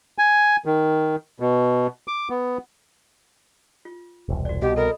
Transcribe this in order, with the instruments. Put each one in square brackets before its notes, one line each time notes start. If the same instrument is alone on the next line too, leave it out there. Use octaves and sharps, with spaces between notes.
[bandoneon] G#5
D#3
B2
D6
B3
[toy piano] F4
[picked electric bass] E1 C2
[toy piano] F#4 D5
[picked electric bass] C2 B2 [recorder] G4 [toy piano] D#5
[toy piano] A4 D#5 B5 [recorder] A#4